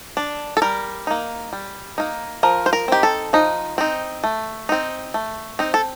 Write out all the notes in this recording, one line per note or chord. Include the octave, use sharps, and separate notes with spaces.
D4
A4
G3 A#4
A#3 D#4
G3
A#3 D#4
F3 A#4
C5
A#4
C4 D#4 G4
A4
F3 D#4
C4 D#4
A3
C4 D#4
A3
C4 D#4
A4